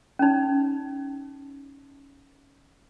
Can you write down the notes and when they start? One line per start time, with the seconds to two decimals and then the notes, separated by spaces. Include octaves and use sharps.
0.19 C#4 D#4